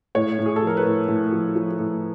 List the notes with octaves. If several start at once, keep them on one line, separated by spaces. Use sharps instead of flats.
A2 C#5
A2
G#4
A4
F3 A#4
B4
A2
A2
F3
F3
A2